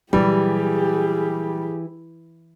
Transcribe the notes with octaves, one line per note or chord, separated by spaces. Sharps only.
A#2 E3 F#3 G3 G4 G#4